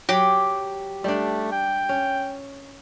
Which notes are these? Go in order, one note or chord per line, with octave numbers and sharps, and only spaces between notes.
F#3 G4
G3 A3 D4
G5
C#4